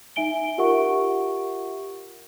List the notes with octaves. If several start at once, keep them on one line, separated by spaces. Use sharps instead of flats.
D#4 E5 G#5 D7 G7
F4 G4 A#4 E5 F#5 C#6